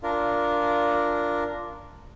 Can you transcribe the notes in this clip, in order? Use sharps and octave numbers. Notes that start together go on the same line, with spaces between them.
D4 F4 A#4